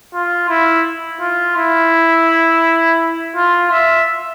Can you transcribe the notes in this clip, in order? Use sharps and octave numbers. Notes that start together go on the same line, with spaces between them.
F4
E4
F4
E4
F4
E5